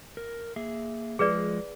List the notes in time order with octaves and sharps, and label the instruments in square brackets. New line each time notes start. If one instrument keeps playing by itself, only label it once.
[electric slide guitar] A#4
A#3 G#4 E5
[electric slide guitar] F3 G#3 [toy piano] G#4 B4 D5